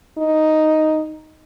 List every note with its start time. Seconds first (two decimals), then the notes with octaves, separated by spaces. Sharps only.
0.18 D#4